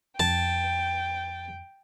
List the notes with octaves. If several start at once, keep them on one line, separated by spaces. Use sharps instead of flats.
F2 G5 A5